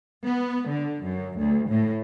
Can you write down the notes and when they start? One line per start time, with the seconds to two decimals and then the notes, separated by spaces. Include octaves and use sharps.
0.23 B3
0.68 D3
1.03 F#2
1.39 D2
1.69 A2